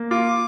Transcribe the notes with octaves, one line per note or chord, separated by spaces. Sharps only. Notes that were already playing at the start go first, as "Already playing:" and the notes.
Already playing: A#3
F4 D6